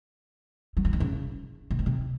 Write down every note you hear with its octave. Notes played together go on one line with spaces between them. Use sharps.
F#3
F3
D#3
C#3
C3
A#2
C3